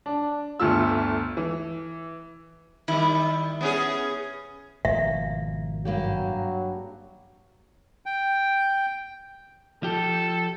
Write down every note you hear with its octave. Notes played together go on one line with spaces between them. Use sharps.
D4
G1 D2 A3 F4 E6
E3
D#3 G3 E4
B3 C#4 G#4
G#1 B2 F3 A#3 E5
G2 F#3 A#3 G4
G5
F3 G4 A4